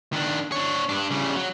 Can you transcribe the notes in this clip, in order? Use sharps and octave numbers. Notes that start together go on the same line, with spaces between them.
D#3 D4
D4 C#5
G2 D4
C#3 G3
F#3